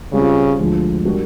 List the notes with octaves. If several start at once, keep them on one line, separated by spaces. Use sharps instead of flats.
C#3 G3 C4 F4
D2 D3 F3 G#3
G3 A#3 D4 F#4